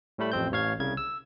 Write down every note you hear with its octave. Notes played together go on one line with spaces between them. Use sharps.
A2 G3 A3 B5
A1 F2 C4 G6
A1 C#5 F5 G#6
C2 C#3 G#6
E6